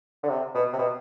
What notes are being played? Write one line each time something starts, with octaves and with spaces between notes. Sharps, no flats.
D3
C3
B2
C3
B2